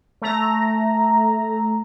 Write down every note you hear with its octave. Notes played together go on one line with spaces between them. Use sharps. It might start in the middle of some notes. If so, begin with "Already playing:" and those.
A3 A#5